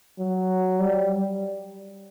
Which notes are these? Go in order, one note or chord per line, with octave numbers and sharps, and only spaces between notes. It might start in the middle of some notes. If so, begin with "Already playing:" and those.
F#3
G3